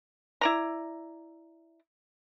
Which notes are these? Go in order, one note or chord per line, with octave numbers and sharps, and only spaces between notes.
E4 D5 A#5